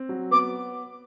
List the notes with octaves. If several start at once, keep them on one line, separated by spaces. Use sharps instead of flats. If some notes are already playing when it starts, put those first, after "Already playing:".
Already playing: C4
F#3
B3 D6